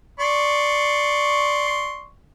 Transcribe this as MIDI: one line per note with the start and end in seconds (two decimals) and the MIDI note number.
0.20 2.07 74
0.20 2.07 84
0.20 2.07 85